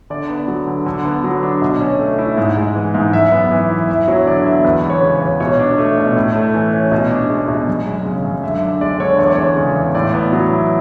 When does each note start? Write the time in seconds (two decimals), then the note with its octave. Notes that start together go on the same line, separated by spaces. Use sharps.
0.10 D3 D5
0.29 B3
0.48 F#3
0.67 D3
0.86 D3
1.05 B3
1.24 F#3
1.43 D4
1.62 B2
1.81 C#4
1.99 A3
2.19 E4
2.37 G#2
2.57 G#3
2.75 E3
2.95 G#2
3.13 F#2 E5
3.32 B3
3.51 E3 E5
3.70 E4
3.89 E2 E5
4.08 F#3 C#5
4.27 D3 D5
4.46 B3 E5
4.64 E2 B4
4.83 G#3
4.90 C#5
5.02 C#3
5.15 C#5
5.22 E2
5.40 B2 C#5
5.59 D4
5.78 A3
5.97 B2
6.16 A2
6.36 A3
6.54 E3
6.73 C#4
6.92 B2
7.11 D4
7.30 G#3
7.48 B2
7.68 F#2
7.86 G#3
8.05 C#3
8.25 F#2
8.43 D3 E5
8.62 D4
8.81 G#3 D5
9.00 D3 C#5
9.19 E2 C#5
9.26 D5
9.33 G#3 C#5
9.57 C#3
9.76 E2
9.95 A2 D5
10.14 B3
10.33 F#3
10.52 E4